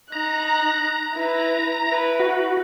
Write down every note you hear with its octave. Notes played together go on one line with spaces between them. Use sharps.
D#4 A#5 F#6
E4 B4
E4 B4
F#4